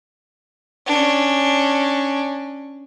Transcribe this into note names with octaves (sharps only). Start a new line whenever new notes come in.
C#4 D4